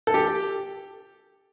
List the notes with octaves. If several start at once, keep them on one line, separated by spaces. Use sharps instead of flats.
A4
G4